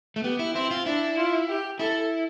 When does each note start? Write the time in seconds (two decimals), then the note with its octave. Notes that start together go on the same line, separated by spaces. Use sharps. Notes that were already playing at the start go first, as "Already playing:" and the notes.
0.16 A3
0.24 B3 G4
0.39 E4
0.54 C4 E4
0.71 F4
0.86 D4 E4
1.17 F4
1.49 G4
1.79 E4 A4